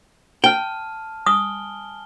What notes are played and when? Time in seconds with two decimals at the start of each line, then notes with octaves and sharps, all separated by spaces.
0.44 G5 A5 F6
1.26 G#5 D#6 F6 G7